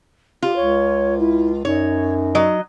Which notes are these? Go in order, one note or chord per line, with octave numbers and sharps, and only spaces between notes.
F4 G4
C#2 C#5
E4
F#2 D#4 C#5
F#3 D#5